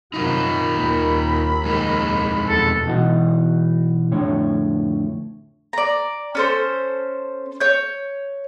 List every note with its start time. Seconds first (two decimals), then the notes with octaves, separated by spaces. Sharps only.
0.14 F#2 C3 F#3 D#4 F4 A#4 B5
0.74 D#2 A#3
1.63 F2 G#3 D#4
2.48 E2 B2 A4
2.86 B1 B2 E3 D#4 F#4
4.11 F2 A2 D3 C#5
5.73 D5 A#5
6.35 C#4 A4 C5
7.60 C#5 G6